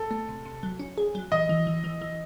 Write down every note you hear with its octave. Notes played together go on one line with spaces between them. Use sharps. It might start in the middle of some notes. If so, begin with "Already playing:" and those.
Already playing: A4
A3
C3
C3
F#3
C#4
G#4
F#3
E3 D#5
E3
E3
E3
E3